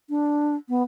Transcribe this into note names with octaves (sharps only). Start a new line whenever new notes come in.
D4
B3